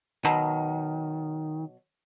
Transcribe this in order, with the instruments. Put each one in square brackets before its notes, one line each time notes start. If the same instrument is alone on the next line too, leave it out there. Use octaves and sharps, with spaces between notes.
[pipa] B2 F#3 [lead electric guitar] D#3